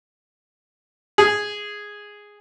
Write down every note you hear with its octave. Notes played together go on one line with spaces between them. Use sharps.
G#4